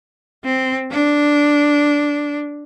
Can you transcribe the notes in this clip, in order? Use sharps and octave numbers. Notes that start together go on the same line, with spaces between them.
C4
D4